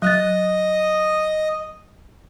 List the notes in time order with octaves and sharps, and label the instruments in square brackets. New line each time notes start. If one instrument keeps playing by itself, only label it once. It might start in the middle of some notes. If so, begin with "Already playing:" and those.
[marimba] F#3 F#6 A6 [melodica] D#5